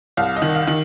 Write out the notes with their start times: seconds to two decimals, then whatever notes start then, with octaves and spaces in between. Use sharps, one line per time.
0.17 C2 F5
0.36 D#5
0.42 D#3
0.55 F5
0.67 D#3